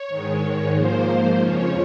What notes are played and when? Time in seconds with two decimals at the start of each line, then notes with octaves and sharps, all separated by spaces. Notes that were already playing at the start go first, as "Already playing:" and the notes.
Already playing: C#5
0.08 G#2 D#3 G#3
0.74 G#2 F3 A#3 C5
1.41 F2 C#3 F3 C#5